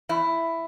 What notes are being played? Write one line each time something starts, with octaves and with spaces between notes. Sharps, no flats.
E2 E4